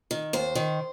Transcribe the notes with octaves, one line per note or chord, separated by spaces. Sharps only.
D#3
D#2 C5
D#3